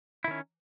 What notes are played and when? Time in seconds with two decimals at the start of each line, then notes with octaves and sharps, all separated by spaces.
0.24 E4
0.28 D#3
0.31 C#4